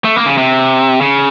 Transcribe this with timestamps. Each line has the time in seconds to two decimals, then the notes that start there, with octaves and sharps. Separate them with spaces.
0.05 A3
0.16 A#3
0.26 C#3
0.38 C3
1.01 C#3